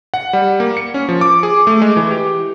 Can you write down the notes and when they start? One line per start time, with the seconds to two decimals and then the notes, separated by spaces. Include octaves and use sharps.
0.14 F#5
0.33 G3
0.60 A#3
0.77 C#7
0.94 C#4
1.09 F3
1.21 D6
1.43 G#4
1.67 A3
1.82 G#3
1.97 E3
2.11 G4